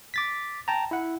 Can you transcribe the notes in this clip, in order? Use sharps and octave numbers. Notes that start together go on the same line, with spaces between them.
D6 A6 B6
G5 A5 A#5
E4 F#5